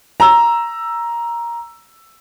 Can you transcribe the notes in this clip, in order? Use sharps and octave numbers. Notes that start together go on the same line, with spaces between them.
A#5 E6